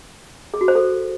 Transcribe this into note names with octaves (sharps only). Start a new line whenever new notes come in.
G#4
F#4
C5
A4